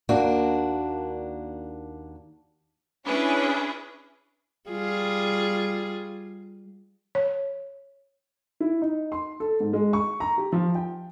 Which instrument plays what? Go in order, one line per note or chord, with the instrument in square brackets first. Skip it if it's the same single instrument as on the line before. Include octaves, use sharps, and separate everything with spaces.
[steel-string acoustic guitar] D#2 A#3 D4 F#4
[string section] C#4 D4 E4 G#4 B4 C#5
[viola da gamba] G3 F4 G#4
[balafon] C#5
[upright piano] E4
D#4
C6
A4
G#2
G#3
C#6
A#5
G4
F3
G5